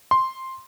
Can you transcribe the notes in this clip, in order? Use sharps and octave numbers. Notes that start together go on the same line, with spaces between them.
C6